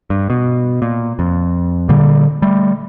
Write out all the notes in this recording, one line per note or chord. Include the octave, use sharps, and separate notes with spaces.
G2
B2
A#2
F2
A#2 D3 G3 A#3
G3 A3